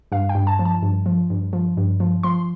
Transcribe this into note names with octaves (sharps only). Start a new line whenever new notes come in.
G2 F5
G5
G2
A5
F3
A5
G2
F3
G2
F3
G2
F3
F3 C6